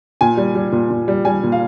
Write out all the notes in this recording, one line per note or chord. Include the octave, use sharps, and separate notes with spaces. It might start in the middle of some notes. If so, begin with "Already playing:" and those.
A#2 G#5
G3
G3
A#2
A#2
G3
G3 G#5
A#2
F5